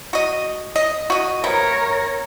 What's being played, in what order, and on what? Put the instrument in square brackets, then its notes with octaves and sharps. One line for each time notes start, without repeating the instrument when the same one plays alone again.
[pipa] F#4 D#5
D#5
F#4 D#5
[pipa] C3 B3 [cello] A#4 C#5